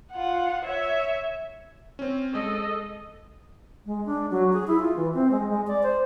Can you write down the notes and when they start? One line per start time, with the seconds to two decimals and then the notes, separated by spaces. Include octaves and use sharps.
0.12 F4 F#5
0.63 C#5 E5
1.99 C4 C#4
2.35 G#3 A4 D#5
3.85 G#3
4.06 D4
4.31 F#3
4.53 G#4
4.67 E4
4.80 F4
4.97 E3
5.14 C4
5.31 G#3
5.49 G#3
5.67 D5
5.83 C5